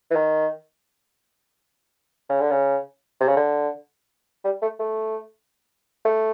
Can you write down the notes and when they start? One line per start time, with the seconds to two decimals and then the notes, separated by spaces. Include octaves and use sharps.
0.11 E3
0.15 D#3
2.29 C#3
2.40 D3
2.51 C#3
3.21 C3
3.28 C#3
3.36 D3
4.44 G3
4.62 A3
4.80 A3
6.05 A3